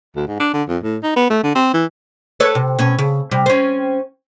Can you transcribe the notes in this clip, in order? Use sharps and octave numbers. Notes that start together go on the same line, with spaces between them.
D2
G#2
D4
D3
F2
A2
D#4
B3
A3
D3
C4
E3
A4 B4 C#5
C3
B2 C#4
C#3
C3 G3
C4 C#4